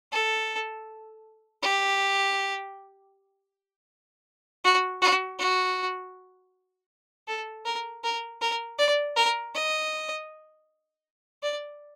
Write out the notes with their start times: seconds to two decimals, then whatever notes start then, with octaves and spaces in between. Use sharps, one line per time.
0.12 A4
1.63 G4
4.64 F#4
5.02 F#4
5.39 F#4
7.28 A4
7.65 A#4
8.04 A#4
8.41 A#4
8.78 D5
9.16 A#4
9.54 D#5
11.43 D5